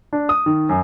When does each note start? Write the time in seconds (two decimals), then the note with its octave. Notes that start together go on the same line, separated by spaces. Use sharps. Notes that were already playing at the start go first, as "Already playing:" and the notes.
0.13 D4
0.29 D#6
0.46 D#3
0.69 F#2